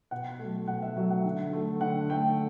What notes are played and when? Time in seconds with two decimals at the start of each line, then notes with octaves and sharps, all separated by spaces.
0.11 B2 F#5
0.39 F#3 A3
0.68 B2 F#5
0.82 E5
0.97 F#3 A3 E5
1.10 F#5
1.25 D3
1.53 A3
1.81 D3 F#5
2.09 A3 G5